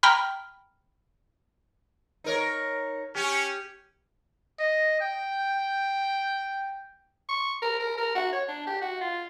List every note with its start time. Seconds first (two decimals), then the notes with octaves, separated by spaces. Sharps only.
0.03 G5 A#5 B5 F6
2.24 D#4 A#4 C#5
3.15 C#4 G4
4.59 D#5
5.00 G5
7.29 C#6
7.62 A#4
7.80 A#4
7.97 A#4
8.15 F#4
8.33 C#5
8.48 D4
8.67 G4
8.82 F#4
9.01 F4